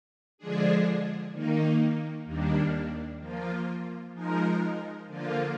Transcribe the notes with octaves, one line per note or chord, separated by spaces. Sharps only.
D3 F3 G#3 D4 G#4
D#3 A#3 D#4
D#2 D#3 G3 A#3 D4
F3 A#3 F4
F3 G#3 D#4 A#4
D3 F3 A#3 F4